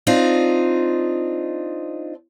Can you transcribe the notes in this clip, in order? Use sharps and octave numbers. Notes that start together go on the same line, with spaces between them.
C4 D4 D#4 F4